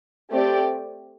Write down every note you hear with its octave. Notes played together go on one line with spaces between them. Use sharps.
A3 C4 G4 D5